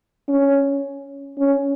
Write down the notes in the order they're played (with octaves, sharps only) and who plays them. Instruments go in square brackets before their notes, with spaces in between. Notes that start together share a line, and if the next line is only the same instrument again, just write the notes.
[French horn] C#4
C#4